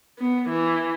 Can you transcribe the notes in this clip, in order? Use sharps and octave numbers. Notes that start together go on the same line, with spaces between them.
B3
E3